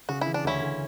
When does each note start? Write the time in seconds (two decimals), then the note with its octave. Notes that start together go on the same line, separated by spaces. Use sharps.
0.09 C#3 F#4
0.21 E3 E4
0.34 D4
0.44 D2 C#4 E4
0.61 D2